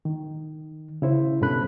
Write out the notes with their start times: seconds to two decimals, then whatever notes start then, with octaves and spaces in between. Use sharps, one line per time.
0.05 D#3
1.02 C#3 E4 C5
1.41 G2 B2 C#4 A4 B5 F#6